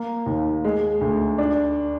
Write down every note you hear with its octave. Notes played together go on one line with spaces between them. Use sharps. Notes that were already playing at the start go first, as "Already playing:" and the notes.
Already playing: A#3
D#2
G#3
D2
D4